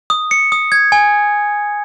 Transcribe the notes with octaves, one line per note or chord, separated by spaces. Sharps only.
D#6
C#7
D#6
G#6
G#5